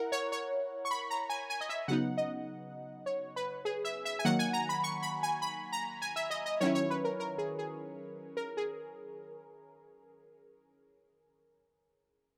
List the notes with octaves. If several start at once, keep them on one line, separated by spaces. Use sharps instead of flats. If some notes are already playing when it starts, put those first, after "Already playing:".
Already playing: E4 A#4 F#5
C#5
C#5
C#6
B5
A#5
G#5
G#5
D#5
E5
C#3 F#3 B3 D#4 F#5
D#5
C#5
B4
G#4
E5
E5
G#5
D#3 F#3 A#3 F#5
G#5
A#5
B5
C#6
B5
G#5
B5
A#5
G#5
E5
D#5
D#5
D#3 F#3 C#4 E4 C#5
C#5
B4
A#4
A#4
G#4
G#4
A#4
G#4